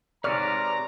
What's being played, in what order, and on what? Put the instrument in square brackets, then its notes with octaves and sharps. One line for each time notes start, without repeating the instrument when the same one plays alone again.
[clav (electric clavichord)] G#2 C3 C#5 [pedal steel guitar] B4 F6 [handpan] D5 [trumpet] A#5